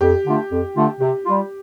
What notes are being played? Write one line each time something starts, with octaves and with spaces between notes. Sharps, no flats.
F2 G4
D3 A3 D4 F4
F2
D3 A3 D4 F4
C3 G4
G3 F4